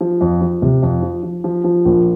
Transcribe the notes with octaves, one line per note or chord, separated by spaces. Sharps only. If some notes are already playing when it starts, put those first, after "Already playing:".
F3
F2
F3
C3
F2
F3
F3
F3
F3
A#1